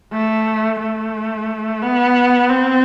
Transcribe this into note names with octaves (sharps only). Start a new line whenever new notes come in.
A3
A3
B3
C4